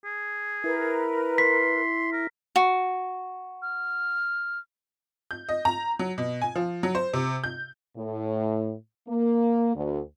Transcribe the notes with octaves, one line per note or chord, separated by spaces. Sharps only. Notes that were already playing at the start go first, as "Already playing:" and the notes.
G#4
E4 A#4 B4
C6 B6
A#4
F#4
F6
G6
D#5
A#5
F#3
B2
G#5
F3
F#3
C5
C3
G6
A2
A#3
D2